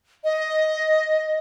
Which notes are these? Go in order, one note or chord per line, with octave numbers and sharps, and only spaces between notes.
D#5